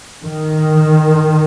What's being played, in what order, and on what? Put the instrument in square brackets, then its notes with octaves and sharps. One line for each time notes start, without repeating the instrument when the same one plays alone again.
[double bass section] D#3